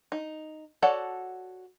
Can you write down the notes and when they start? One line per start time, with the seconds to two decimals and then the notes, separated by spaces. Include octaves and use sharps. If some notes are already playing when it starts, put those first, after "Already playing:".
0.12 D#4
0.82 F#4 A4 C#5 D5 F#5